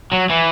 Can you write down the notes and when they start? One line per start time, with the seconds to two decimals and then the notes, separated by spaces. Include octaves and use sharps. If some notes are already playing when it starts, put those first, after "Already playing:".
0.13 F#3
0.31 E3